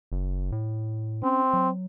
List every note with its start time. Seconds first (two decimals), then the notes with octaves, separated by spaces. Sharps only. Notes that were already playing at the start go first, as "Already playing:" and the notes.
0.12 F#1
0.52 A2
1.23 C4 C#4
1.53 F#3